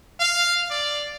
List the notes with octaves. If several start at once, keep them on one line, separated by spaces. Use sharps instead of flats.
F5
D5